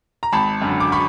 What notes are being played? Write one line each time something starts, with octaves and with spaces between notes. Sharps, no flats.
A#5
G#1 A5 B5
F#2 D3
D6
B5 C#6